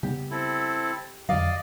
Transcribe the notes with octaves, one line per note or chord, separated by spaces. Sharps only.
C#3 G3 B3 G4
C4 E4 A4
F2 D3 F#3 D5 D#5 F5